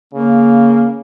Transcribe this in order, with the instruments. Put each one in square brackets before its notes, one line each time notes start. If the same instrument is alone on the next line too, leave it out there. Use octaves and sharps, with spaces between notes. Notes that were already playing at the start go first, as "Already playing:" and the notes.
[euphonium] C#3 [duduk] A#3